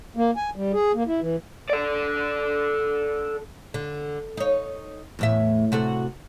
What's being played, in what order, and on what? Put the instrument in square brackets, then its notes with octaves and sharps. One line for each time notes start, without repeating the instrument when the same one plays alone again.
[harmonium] A#3
G#5
G3
G#4
A#3
E4
E3
[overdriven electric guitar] A4 D5
[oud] D3
D#4 C#5
E2 A2 E5
C3 F#4 A4